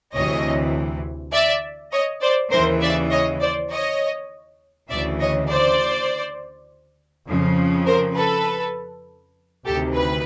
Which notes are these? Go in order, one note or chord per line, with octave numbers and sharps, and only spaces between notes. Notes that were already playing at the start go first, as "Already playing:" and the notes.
D2 C3 E3 C#5 D#5
D5 E5
C#5 D#5
C5 D5
D#2 C#3 E3 A#4 C5
D5 E5
C#5 D#5
C5 D5
C#5 D#5
D2 C#3 E3 D5 E5
C#5 D#5
C5 D5
F2 C#3 F3
A#4 C5
A4 B4
D2 C3 D#3 G4 A4
B4